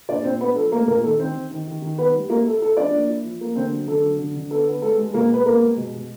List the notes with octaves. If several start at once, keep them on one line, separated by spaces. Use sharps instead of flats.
A#2 D4 D5
A#2 C4 C5
B3 D4 B4
F3 A4
A3 A#3 A#4
A#2 A#3 A#4
D#3 A4
D#3 C4 C5
D#3
D#3
D#3
D#3
B3 B4
G3
A#3 E4 A#4
E4 A4
E4 A4
F3 D4 D5
A#3
E4
F3
A#3
D3 C4 C5
F#3
D3 A4
F#3
D3
D3
B3 A4
B3
G#3 A4
G#3
B2 A#3 A#4
B3 B4
A#3 B3 A#4
G#3
B2
B2